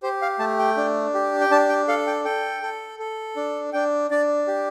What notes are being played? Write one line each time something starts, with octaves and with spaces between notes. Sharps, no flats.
G4 C5
F5
A3 A5
G5
D4
G4
G5
D4 A5
G5
A4 F5
G5
A4 G5
A4
A4
D4
D4 G5
D4 D5
G4